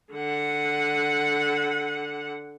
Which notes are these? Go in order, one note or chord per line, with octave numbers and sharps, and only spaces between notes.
D3 F#5